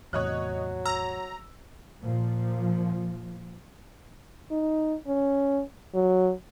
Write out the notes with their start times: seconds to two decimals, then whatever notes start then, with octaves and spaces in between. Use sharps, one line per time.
0.13 E2 A2 C3 F#3 C#5 D#5 F#6
0.85 A#5 E6
2.02 A#2 F3
4.51 D#4
5.07 C#4
5.94 F#3